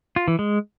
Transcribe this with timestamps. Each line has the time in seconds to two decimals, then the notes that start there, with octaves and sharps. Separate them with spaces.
0.16 F4
0.28 E3
0.39 G#3